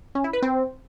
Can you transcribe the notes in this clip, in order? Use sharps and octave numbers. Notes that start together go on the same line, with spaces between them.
C#4
E4
B4
C4